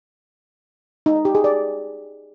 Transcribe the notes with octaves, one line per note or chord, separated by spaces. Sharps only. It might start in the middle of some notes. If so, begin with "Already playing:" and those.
D#4
D#5
G4
G#4
D5